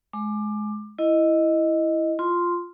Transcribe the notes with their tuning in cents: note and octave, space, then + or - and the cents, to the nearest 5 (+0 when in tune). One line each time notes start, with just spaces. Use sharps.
G#3 +25 D6 +20
E4 +5 D#5 +0
F4 +0 C6 -5